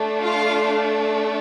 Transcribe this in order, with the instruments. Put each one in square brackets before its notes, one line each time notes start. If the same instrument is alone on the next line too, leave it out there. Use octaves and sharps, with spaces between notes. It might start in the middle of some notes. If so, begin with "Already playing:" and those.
Already playing: [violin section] A3 D4
F4 F5